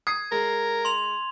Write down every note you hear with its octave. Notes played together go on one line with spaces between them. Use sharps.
D#6 G#6 C7
G#3 A#4
C6 F7